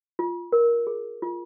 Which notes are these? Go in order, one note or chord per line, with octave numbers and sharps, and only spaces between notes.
F4
A#4
G#4
F4